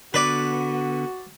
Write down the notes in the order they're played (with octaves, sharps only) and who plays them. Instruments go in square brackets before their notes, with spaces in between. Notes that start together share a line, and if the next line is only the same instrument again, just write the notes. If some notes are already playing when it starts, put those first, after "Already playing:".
[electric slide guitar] D3 B3 [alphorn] F#4 [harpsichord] B4 D5